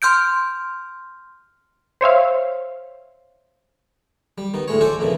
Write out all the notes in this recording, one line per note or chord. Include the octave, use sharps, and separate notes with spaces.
C6 F6 G6 D7
C5 C#5 E5 F5
G3
D#3 B3
D2 A2 G#3 C#5
F#4 A4 C5 D5 G#5
F2 A#2 C#3 E3